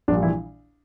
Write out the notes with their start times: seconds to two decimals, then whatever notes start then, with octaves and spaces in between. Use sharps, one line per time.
0.08 A#1 A#2 G3 D4
0.23 E3 E4